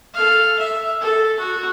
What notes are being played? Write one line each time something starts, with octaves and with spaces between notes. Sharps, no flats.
A4 F5
E5
A4
F#4